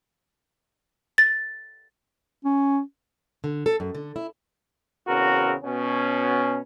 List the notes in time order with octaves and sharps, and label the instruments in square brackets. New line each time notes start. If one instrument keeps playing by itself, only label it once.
[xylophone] A6
[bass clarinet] C#4
[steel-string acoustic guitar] D3
A4
F#2
D3
E4
[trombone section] E2 C#3 C4 F#4 A#4
B2 C#4